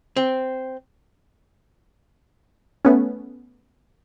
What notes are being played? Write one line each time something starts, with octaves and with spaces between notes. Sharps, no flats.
C4
A3 B3 C#4